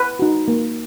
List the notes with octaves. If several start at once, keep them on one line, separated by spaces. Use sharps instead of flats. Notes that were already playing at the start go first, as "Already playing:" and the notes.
Already playing: B4
D#4 F#4
A#3